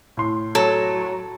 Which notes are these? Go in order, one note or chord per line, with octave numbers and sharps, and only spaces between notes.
A2 C6
F#3 A4